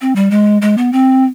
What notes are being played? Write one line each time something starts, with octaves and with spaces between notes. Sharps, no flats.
C4
G3
G#3
G#3
B3
C4